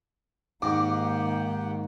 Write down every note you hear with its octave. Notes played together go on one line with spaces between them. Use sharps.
G#2 D#3 A#3 G4 F#5 G5 D6